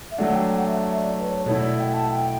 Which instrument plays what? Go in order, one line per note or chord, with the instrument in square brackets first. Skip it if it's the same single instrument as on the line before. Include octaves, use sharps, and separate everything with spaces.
[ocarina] E5
[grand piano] F#3 A3 D4 [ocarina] F#5
[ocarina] G5
F#5
E5
E5
D5
B4
C#5
[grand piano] B2 A3 E4 [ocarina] C#5
[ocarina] D5
G5
A5
G5